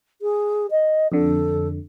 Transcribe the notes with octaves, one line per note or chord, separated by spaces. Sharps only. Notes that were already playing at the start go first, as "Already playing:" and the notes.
G#4
D#5
F2 D3 A4